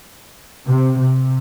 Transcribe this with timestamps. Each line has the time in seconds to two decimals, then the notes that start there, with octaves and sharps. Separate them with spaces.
0.66 C3
0.98 C3